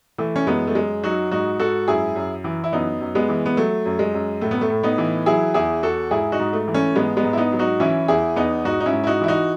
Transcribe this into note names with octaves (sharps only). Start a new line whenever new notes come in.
E3 A3
C#4
F#2 G#3 B3
A3
F#2 G#3
F#3 D#4 F#4
G#2 D#4 F#4
G#2 F#4 A4
F#2 E4 G#4
F#2
E3
E4
F#2 B3 D#4
F#2
G#3 B3
E3
B3
F#3 A3
F#2
G#3
F#2
A2 A3
B3
A3
A2
B3 D#4
E3
F#3 E4 G#4
E2 E4 G#4
E2 F#4 A4
G#2 E4 G#4
D#4 F#4
G#2
A3
E3
A3 C#4
G#2 G#3 B3
G#3 B3
G#2
E4
B3 D#4
F#3
D#4 F#4
E3 C#4 E4
E2 E4 G#4
E2 B3 D#4
G#2 D#4 F#4
D#4
C#4 E4
G#2
E4
D#4 F#4
E3 E4
D#4 F#4